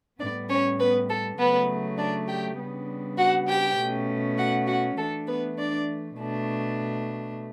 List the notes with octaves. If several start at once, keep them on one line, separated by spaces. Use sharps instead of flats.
A2 G3 B3 D4 D5
C#4 C#5
B3 B4
A4
C#3 F#3 A3 B3 B4
D4 D5
G4 G5
C#3 G3 B3 D4
F#4 F#5
G4 G5
B2 A3 C#4
F#4 F#5
F#4 F#5
E3 A3 D4 A4
B3 B4
D4 D5
B2 A3 D4